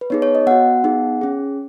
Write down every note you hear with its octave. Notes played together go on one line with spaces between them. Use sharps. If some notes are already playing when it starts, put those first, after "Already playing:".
B4
B3 D#4 G#4 C#5
C#5
D#5
B3 F#4 F#5
B3 D#4 G#4
C#4 G#4